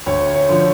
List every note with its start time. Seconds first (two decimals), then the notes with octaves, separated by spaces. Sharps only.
0.06 D2 C#5
0.34 C#5
0.49 D3 F3